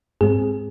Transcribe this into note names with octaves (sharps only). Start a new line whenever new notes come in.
G#2 G#3 C4 G#4